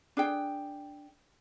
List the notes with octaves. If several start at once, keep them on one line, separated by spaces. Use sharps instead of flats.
D4 G#4 G5